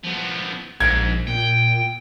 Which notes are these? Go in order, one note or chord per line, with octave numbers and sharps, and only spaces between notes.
F3 B3
A#1 G#2 G#6
A#2 G5